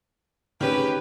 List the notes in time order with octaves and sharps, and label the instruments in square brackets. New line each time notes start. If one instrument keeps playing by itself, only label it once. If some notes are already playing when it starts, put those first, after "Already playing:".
[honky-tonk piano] D#3 C#4 G#4 [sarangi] G4 [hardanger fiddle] B4